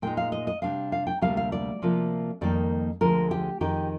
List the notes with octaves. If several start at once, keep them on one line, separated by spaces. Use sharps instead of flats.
A#2 G#3 D#4 G5
F5
D#5
D#5
C3 G3 D4 F5
F5
G5
D2 C3 G3 A#3 D4 F5
F5
D5
C3 F3 A#3 F4
F2 D#3 G3 A#3 D#4 D5
D2 D3 F3 G#3 A#4
G4
F2 D#3 G#3 D#4 G4